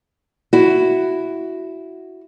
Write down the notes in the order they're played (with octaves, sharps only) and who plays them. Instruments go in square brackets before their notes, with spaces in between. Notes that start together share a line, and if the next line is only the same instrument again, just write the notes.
[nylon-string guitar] E4 F#4